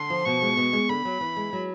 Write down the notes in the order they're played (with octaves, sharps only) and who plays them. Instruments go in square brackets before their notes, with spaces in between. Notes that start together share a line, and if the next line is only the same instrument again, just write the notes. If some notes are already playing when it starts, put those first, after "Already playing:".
Already playing: [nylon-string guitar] D3 [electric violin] C6
[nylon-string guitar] F3
[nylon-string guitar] B2 [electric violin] C#6
[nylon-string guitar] G#3
B2
G#3
[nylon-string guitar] D3 [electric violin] B5
[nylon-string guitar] F#3
E3
G#3
F#3